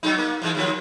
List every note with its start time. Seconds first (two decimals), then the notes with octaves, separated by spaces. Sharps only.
0.03 F#3 G#3 D#4
0.18 A#3
0.42 G#2 E3 G#3
0.55 D#2 F3 F#3